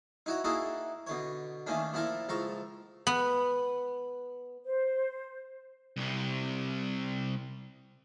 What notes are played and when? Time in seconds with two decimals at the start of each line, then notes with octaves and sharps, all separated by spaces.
0.26 D#4 E4 F#4 C#5
0.44 A#3 D#4 E4 F#4 G#4 A4
1.07 B2 D3 C#5
1.66 D#3 A3 A#3 C#4 D4
1.94 A#2 F3 E4 A4 A#4
2.29 C#2 F3 A4 A#5 C#6
3.07 B3
4.64 C5
5.97 C2 C3